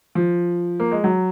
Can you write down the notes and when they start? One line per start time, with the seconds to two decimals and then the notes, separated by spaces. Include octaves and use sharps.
0.15 F3
0.80 A#3
0.91 G#3
1.04 F#3